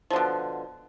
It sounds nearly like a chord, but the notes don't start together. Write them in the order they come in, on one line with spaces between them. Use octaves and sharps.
F3 D3 B2